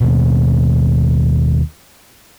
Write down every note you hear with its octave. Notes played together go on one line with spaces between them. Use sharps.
D#2 B2